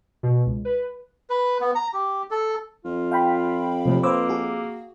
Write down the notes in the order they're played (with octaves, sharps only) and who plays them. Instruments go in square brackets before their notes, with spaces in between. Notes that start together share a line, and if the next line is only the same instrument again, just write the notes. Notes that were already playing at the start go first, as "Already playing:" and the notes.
[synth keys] B2
C#2
B4
[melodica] B4
B3
A#5
G4
A4
[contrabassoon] F2 [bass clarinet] F4
[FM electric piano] F5 G5 B5
[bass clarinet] D#2 [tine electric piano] C3 F3 A3
[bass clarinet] A#3 [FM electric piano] B4 C5 [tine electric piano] D6 E6
[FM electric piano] F#4 G#4